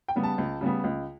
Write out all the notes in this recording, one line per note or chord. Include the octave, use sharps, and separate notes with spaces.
G5
C#3 G3 B3
A5
C#2
C#3 G3 B3
C#2